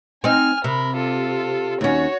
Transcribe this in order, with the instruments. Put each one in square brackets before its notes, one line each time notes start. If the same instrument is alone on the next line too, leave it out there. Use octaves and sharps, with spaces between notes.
[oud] C4 D#4 [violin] G#5 F6
[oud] C3 [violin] A#4 B5
[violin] F4 A4
[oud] D#2 C#4 [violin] F#4 C#5